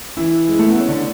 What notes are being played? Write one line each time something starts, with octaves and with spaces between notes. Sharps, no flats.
E3 E4
G#3
A3
B3
C#4
D3 D4